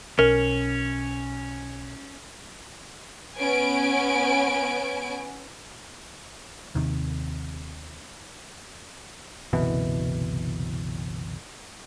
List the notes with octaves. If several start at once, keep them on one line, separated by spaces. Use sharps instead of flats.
B1 C#4 A#4
B3 C#4 G#5 D7
D#2 C3 D#3
F#1 C2 B2 E3